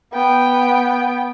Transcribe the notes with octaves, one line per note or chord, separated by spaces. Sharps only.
B3 G5